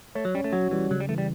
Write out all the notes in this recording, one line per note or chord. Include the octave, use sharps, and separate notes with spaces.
A3 C#5
F#3
G3 C#4
A3
F#3 F#4
E3 G3
C#3 F#3
G3
E3 A3
G3